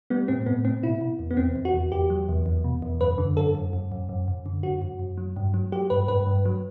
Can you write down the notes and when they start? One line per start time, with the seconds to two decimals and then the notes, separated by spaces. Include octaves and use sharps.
0.10 G3 B3
0.28 A2 C4
0.46 A2 B3
0.65 A2 C4
0.83 B2 E4
1.01 B2
1.19 E2
1.31 B3
1.37 E2 C4
1.56 E2
1.65 F#4
1.74 E2
1.92 E2 G4
2.10 F#3
2.29 E2
2.46 E2
2.64 B2
2.82 E2
3.01 F#2 B4
3.18 D3
3.37 F#2 A4
3.55 F#2
3.73 F#2
3.92 F#2
4.09 F#2
4.28 F#2
4.46 D3
4.63 F#2 F#4
4.82 F#2
4.99 F#2
5.18 F#3
5.36 G2
5.54 F#3
5.72 F#3 G4
5.90 G2 B4
6.08 G2 B4
6.27 G2
6.46 F#3